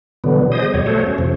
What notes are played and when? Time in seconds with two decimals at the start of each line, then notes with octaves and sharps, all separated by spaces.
0.24 B2 D3 E3 F#3 G3 B3
0.52 G#4 C5 D#5 D#6
0.74 E2 B2 F#3 G3 C#5
0.86 A3 F#4 A4 C5 C#5
1.06 C#4
1.18 F2 C3 F3